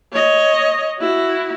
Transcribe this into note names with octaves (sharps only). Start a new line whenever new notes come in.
C#5 D#5
E4 F#4